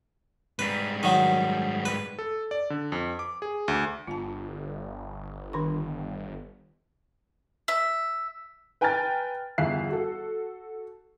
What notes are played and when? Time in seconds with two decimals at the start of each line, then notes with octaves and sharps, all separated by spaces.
0.59 G#2 G3 B4
1.03 D#3 F#3
1.85 B4
2.19 A4
2.51 D5
2.70 D3
2.92 F2
3.19 D6
3.42 G#4
3.68 D2
4.07 G1 F4 A5
5.53 D#3 D4 C#6
7.68 E5
8.81 B4 G5 G#5 A#5 F6 A6
9.58 G1 E2 E5 F5 F#6 C7
9.89 F#4 A4